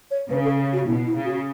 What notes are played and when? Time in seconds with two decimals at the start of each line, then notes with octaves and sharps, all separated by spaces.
0.11 C#5
0.30 C#3 B4
0.44 A4
0.73 F#4
0.87 B2 E4
1.06 E4
1.16 C#3
1.25 F#4